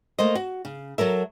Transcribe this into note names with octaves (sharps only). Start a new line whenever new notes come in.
A3 A#3 C5 D#5
F#4
C#3
F#3 A4 A#4 E5